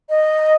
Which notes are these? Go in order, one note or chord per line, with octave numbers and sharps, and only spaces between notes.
D#5